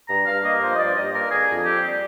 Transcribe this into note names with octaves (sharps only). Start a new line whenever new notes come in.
G2 A#5
G2 F5
A#3 D#5
F3 C5
D#5
G2 D5
D5
G2 D#5
A#3 A#4
D3 G#4
F2
C4 G4
G3